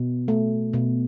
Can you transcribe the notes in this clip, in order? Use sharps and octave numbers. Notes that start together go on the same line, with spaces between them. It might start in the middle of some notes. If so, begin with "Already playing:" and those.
Already playing: B2
A3
B2